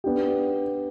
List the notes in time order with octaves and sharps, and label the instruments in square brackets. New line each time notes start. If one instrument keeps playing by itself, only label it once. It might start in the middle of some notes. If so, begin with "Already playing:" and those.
[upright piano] B3 D4 G4